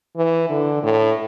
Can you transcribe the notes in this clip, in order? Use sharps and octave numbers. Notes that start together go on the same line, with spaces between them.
E3
D3
A2